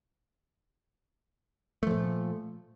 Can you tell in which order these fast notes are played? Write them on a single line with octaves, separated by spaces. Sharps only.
A3 F3 A#2